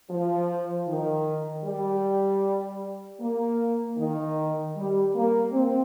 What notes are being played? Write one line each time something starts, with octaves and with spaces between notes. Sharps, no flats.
F3
D#3
G3
A#3
D#3
G3
A#3
C4